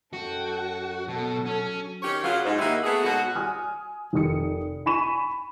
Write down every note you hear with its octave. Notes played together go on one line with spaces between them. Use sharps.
F#2 F#4 A4 G5
B2 F#3 A4
C#4
D#3 C#4 G4 C#5
C#3 F#3 F4
G#2
D#3 A#3 D#4 E4 F#4 G4
A3 B3 F#4 G#4
G#2 B2 F#3 F#4
G#5 D#6 F6
F1 D#3 D#6 C#7
G#5 B5 C#6 D#7 E7